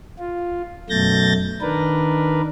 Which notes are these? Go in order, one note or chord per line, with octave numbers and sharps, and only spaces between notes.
F4
F#2 B2 A3 G6 A6 A#6
D#3 D4 A#4 B4